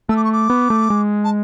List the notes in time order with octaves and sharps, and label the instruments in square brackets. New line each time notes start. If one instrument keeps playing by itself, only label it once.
[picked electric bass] A3 [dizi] E6
[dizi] D6
C#6
D6
[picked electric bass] B3
A3
G#3
[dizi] A5